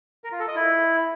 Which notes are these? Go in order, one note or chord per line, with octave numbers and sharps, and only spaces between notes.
A#4
F4
A4
D#5
E4